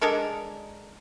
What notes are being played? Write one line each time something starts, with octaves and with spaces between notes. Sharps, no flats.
G#3 D4 A4 A#4